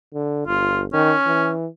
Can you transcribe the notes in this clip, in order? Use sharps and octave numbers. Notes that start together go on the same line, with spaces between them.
D3
G1 F4
D#3 C#4
E3